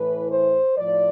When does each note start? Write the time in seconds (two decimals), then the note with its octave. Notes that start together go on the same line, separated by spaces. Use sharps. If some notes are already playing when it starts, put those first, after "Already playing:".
Already playing: A2 E3 B4
0.30 C5
0.78 A2 F3 D5